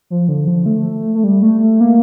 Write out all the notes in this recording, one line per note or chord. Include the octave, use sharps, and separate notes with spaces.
F3
D3
F3
A3
A3
G3
A3
A3
A#3